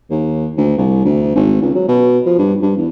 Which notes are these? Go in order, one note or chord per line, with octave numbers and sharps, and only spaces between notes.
D#2
D2
C2
D2
G#1
C#2
F#3
B2
F3
G2
G2
E2